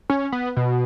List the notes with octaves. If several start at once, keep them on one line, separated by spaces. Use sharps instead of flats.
C#4
B3
B2